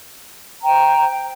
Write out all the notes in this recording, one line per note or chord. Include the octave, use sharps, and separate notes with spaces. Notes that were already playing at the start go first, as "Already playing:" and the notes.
C5 G5 A#5